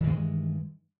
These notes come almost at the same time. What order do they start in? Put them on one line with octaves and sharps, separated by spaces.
D#3 E3 G2 G#3